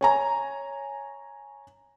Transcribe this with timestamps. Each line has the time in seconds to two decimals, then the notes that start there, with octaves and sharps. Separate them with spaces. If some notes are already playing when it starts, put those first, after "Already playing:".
0.01 C#5 G#5 A#5